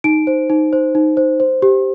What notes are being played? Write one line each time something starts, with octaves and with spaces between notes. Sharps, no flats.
D#4 D7
C5
D#4
C5
D#4
C5
C5
G4